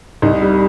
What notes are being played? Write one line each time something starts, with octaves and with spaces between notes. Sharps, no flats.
C2 D#4
G3